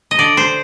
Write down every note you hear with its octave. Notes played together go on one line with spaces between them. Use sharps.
D#5
D3 D5
C5